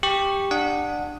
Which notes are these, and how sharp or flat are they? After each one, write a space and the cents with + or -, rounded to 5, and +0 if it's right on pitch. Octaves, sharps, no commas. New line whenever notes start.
G4 +5 C#6 +0
D4 +15 F#5 -20 D#6 +5